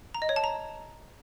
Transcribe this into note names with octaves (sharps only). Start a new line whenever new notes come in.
A#5
D#5
C#5
A5
A#5